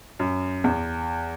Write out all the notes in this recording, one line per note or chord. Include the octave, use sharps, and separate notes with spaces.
F#2
E2